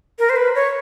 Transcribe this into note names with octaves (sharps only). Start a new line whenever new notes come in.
A#4
C5
B4
C#5